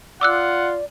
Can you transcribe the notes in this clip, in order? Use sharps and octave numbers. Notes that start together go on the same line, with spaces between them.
F4 D5 F#5 D6 E6 F#6